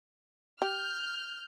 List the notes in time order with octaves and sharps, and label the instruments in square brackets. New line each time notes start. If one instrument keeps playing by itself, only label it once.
[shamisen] G4 [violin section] F6 G6